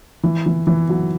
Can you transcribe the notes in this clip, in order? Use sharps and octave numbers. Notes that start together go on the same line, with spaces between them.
E3
E3
E3
F#3